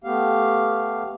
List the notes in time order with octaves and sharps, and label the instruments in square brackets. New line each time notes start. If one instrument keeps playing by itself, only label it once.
[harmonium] A3 B3 G4 F5